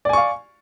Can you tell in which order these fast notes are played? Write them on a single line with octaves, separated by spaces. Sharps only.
D5 G#5 C#6 F5